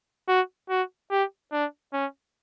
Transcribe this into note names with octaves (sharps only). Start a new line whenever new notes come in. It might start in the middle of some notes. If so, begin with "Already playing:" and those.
F#4
F#4
G4
D4
C#4